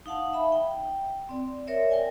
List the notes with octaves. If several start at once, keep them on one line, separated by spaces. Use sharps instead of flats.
D#4 F5 F#5 A5
E5 B5
G5
C4 D5
A#4 C#5 D5 E5
A#4 G5 G#5